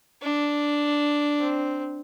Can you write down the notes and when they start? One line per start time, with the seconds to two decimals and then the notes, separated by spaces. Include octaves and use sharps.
0.22 D4
1.40 C4